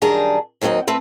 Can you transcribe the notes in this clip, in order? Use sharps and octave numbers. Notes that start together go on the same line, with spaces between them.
F#2 D#3 G3 D4 G#4 A#5
D#2 D#3 F#3 C4 D#5
A3 C4 B4